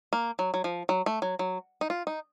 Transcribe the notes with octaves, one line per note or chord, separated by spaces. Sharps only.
A#3
F#3
F#3
F3
F#3
A3
F#3
F#3
D#4
F4
D#4